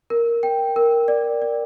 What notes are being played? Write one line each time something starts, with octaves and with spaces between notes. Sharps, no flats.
A#4
G5
A#4
D5
D5